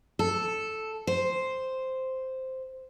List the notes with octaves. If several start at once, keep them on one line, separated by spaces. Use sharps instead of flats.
A4
C5